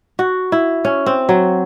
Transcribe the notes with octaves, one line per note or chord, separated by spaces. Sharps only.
F#4
E4
C#4
C4
F#3